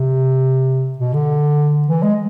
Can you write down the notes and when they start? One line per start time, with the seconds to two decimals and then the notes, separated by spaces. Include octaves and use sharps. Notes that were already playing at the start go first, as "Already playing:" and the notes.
Already playing: C3
0.98 B2
1.14 D3
1.88 E3
2.03 G#3